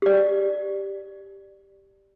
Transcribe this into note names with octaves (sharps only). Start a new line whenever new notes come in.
G4 D5